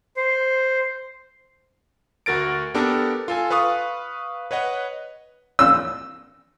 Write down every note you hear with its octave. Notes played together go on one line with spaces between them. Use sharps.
C5
D2 F#4 A#4 A6 D7
B3 D4 G4 A4 A#4
F4 A4 G#5
B4 F5 C#6 D#6
B4 C#5 D#5 F#5
E6